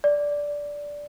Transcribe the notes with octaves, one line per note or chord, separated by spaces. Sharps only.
D5